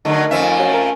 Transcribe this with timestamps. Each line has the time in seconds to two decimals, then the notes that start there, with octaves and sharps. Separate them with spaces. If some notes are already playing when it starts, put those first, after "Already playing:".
0.05 D3 F#3 A3 D#4 A#4
0.31 F2 F3 C#4 E5
0.59 F#3
0.74 A#4